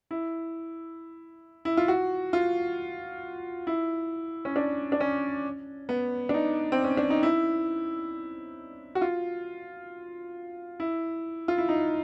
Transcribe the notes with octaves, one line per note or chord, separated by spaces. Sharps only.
E4
E4
F4
F#4
F4
E4
C#4
D4
D4
C#4
B3
D4
D#4
C4
C#4
D4
D#4
E4
F#4
F4
E4
F4
E4
D#4